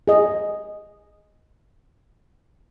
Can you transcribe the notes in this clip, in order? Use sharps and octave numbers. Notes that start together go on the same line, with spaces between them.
G#4 D#5